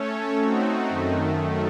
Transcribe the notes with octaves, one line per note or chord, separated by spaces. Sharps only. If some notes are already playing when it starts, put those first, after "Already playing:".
Already playing: A3 C#4 A4 C#5
A3 C4 D#4 F#4
F#2 D#3 A3